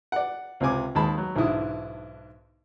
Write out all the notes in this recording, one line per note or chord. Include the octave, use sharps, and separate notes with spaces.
D5 F#5
C#2 C3 C4 G#5 D6
D#2 G#3 A5 B5
F#3
B1 G#2 D3 E4 D#6